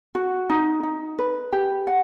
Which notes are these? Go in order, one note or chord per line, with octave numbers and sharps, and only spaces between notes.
F#4
D#4
D#4
B4
G4
F#5